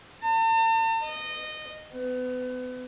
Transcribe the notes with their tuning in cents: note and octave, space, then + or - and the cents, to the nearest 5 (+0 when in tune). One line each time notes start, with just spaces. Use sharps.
A5 +45
D#5 -15
B3 +35